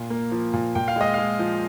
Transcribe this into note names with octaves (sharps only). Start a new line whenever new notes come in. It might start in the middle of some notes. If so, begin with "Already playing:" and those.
Already playing: A#2
A#3
F3
A#2
A#2 G5
F5
G#3 D#5
G#3 F5
F3